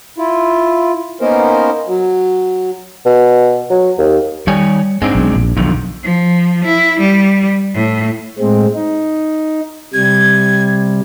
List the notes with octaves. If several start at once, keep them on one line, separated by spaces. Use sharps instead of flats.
E4 F4
A#3 B3 C#4 D#4 A#4 C5
F#3
B2
F#3
D#2
D#3 G3 C#5 G#5
G#2 G#3 C4 D4
B1
A#1
B1 F2 D3 D#3
F3
E4
G3
A2
A2 G#3 C4
D#4
C3 G3 G#6